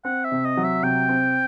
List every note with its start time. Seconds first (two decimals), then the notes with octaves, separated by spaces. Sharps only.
0.05 C4 F#5
0.25 E5
0.32 C3
0.45 D#5
0.57 F#3
0.64 E5
0.83 C3 G5
1.09 C4